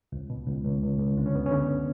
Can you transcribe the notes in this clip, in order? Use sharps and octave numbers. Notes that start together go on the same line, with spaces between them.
C#2
B2
C#2
C#2
C#2
C#2
D3 D4
C#4
F#2 B3
C#4
D3